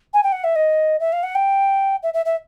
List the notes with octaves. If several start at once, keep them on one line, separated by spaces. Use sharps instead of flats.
G#5
G5
F#5
E5
D#5
E5
F5
F#5
G5
E5
E5
E5